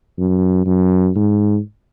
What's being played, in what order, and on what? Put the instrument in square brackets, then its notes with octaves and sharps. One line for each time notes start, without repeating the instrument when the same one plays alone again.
[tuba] F#2
F#2
G#2